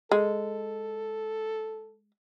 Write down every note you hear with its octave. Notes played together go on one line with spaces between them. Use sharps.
G#3 A4